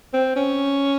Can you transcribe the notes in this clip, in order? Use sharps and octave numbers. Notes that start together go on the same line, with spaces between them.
C4
C#4